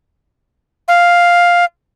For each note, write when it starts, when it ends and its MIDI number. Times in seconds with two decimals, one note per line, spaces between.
0.88 1.65 77